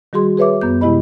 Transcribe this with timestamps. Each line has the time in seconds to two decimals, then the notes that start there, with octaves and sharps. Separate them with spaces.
0.13 D#3 G3 F#4 G#4 C6
0.37 G#4 B4 C#5 E5 D6
0.61 F#2 B3 G6
0.81 C3 G#3 E4 G4 D#5 B5